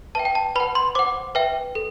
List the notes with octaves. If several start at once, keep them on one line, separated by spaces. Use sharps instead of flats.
B4 E5 G5 A5
G5
A5
B4 F#5 B5
C6
C5 F#5 D6
B4 E5 G5
A4